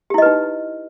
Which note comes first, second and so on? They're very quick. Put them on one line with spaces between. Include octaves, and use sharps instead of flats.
G4 E4 D#5 B4 D#4